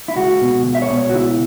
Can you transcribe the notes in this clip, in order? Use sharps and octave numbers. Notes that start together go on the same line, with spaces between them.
E4
C#2 F#4
B2
C#2
E5
C#5
B2
C#5
F#4
C#2 E4